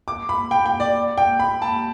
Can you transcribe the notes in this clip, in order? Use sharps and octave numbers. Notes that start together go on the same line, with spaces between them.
D6
B5
G5
G5
D5
G5
B5
A5